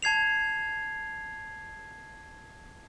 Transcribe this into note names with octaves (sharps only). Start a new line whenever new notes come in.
A5 G#6 C7 F7